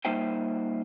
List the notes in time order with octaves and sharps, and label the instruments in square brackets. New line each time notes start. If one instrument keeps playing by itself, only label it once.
[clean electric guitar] G3 A#3 D#4 C5 E5 G5